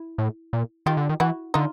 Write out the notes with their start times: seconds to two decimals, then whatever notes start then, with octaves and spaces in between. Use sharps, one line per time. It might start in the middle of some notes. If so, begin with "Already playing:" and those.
Already playing: E4
0.18 A2
0.53 A#2
0.86 D#3 F4 G4
0.97 D3
1.09 D#3
1.20 E3 E4 F#4
1.54 D3 D#4 F4